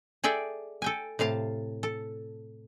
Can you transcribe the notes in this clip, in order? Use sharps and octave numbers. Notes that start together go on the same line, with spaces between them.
G#4 A4 D5 E5 G5
A4 G5 G#5
A2 C3 F5 A5
A4